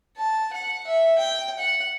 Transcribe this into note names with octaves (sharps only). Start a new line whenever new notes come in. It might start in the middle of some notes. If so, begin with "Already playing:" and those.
A5
F#5
E5
G5
F#5